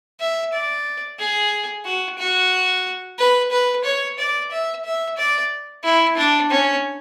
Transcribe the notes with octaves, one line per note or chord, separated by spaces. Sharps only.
E5
D5
G#4
F#4
F#4
B4
B4
C#5
D5
E5
E5
D5
E4
D4
C#4